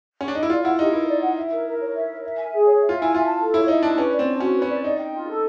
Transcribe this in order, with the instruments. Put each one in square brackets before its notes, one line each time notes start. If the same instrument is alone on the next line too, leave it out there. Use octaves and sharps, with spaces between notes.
[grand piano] C#4
D4
D#4
E4
[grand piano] F4 [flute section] D5
[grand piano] E4 [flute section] F#5
[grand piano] D#4 [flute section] G4
[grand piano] E4 [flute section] A#4
[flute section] D5
F#5
E5
A#4
A#4
C#5
E5
A#4
E5
G#5
G#4
C#5
E5
[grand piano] F4
[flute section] G#5
[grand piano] E4
[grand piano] F4 [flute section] E5
[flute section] A5
A4
[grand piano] E4 [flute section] C#5
[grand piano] D#4 [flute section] E5
[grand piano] D4 [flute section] A5
[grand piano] C#4 [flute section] B4
[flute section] D5
[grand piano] C4
[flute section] D4
[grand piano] C#4 [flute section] F#4
[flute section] B4
[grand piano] C#4
[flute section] D5
[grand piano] D#4 [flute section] D5
[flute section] G5
F4
A4